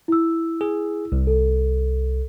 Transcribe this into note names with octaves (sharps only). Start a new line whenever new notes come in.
E4 E6
G#4
C2
A4